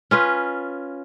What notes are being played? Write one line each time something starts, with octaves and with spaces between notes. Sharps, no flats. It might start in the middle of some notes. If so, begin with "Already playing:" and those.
C#4 F4 B4